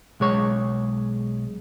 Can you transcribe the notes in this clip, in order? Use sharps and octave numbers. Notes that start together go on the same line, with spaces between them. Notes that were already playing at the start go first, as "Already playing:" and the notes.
B1 G#3 C#5